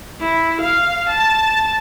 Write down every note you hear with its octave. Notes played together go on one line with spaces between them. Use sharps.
E4
F5
A5